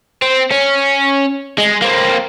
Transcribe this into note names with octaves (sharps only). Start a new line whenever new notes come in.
C4
C#4
G#3
A#3 C4